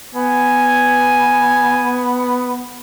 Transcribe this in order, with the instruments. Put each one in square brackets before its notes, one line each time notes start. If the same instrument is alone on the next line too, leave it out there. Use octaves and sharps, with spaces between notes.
[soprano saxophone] B3 [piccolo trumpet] G#5